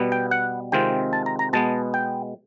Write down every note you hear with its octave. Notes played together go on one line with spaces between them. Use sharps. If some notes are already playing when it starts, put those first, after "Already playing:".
Already playing: B2 G3 B3
G5
F#5
C3 D#3 G#3 C4 F4 G5
A5
A#5
A#5
B2 G#3 B3 A5
G5